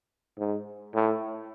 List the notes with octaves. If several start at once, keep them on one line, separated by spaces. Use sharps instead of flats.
G#2
A2